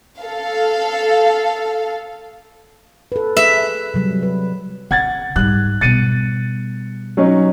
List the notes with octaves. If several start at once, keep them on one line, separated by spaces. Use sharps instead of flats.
A4 F5
A4 B4
G#4 B4 E5
C3 F#3 G3
B4
C#3 F#5 G#6 A6
G#2 G3 F#6
B2 G3 A6 C#7 D#7
F#3 C#4 D#4